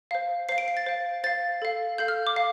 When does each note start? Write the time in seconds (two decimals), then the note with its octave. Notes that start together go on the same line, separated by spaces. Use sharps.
0.11 C5 F5
0.49 C5 F5 C7
0.58 D7
0.68 C7
0.77 A6
0.86 C5 F5
1.24 C5 F5 A6
1.62 A4 F5
1.98 A4 F5 G6
2.08 F6
2.27 D6
2.36 F5